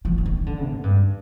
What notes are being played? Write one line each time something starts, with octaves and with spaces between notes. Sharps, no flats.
F3
F3
D#3
D3
G#2
G2